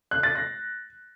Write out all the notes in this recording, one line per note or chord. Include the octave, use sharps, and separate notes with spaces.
F#6
A6
A#6